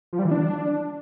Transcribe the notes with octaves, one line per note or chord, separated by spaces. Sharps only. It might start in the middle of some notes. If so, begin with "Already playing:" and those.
F3
G3
E3
D4